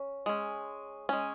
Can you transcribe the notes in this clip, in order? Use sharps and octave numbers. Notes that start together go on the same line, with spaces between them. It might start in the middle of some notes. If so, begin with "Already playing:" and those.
Already playing: C#4
G#3 C#4
G#3 C#4